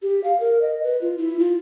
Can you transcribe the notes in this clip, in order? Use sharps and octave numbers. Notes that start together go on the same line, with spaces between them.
G4
F5
A#4
D#5
B4
F4
E4
F4